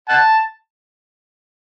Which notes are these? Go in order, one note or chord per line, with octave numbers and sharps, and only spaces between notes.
F#5 A5